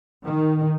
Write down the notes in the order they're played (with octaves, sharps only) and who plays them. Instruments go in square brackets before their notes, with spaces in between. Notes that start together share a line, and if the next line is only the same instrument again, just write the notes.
[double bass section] D#3